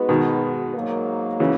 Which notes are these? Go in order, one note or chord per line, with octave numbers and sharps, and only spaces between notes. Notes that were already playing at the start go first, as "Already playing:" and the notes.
Already playing: G#3 B3 D#4 F#4 B4
B2 D#3
G#2 F#3 A#3
C#3 E3